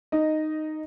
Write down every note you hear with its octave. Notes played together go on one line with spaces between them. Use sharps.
D#4 D#5